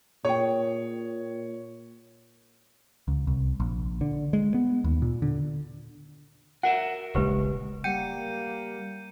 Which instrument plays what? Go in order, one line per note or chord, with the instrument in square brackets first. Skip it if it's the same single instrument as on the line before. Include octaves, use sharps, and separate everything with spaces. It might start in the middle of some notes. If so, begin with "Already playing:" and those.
[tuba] A#2 [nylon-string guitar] G#4 G5 [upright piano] C#5
[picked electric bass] C#2
C2
A#1
D3
G#3
B3
D#2
A#2
D3
[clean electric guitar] F#4 A#4 E5 [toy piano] F#5
[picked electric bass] D#1 A#1 G#3 [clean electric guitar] C#3 [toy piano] G4 B4
[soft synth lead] G3 [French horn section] A#3 [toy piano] F#5 G5 [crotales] G6 C#7 D#7